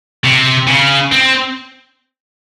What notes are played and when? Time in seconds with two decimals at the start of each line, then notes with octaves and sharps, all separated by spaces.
0.24 C3
0.67 C#3
1.12 C4